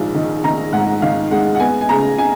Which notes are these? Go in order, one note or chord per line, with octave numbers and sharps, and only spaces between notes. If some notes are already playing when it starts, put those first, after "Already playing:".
Already playing: A#1 G#2 D#3 F5
D#3
D#3 A#5
G#2 F#5
D#3 F5
G#3 F#5
F#5
B3 G#5
G#5
C#3 A#5
G#5